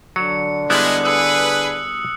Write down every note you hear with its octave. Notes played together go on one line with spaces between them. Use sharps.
D3 F#3 C#7
G3 G#3 B3 E4 F#6 F#7
G#4 B4 D#6 E6 C#7